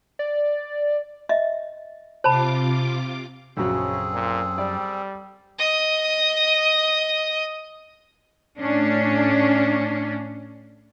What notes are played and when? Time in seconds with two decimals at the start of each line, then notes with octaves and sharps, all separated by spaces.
0.19 D5
1.29 D#5 E5
2.24 C3 F4 C5 A5 B5 D6
3.57 A#1 F#2 C#3 F#3 C4 C#4 G#4 A4
4.14 A#2
4.58 G3 D5
5.58 D#5 D#6
8.58 A2 C#4 D4